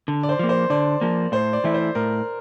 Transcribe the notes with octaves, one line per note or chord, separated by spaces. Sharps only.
D3
D5
C5
F3 A#3
C5
D3 D5
F3 A#3
A2 C5
D5
E3 A3 E4
C5
A2 A#4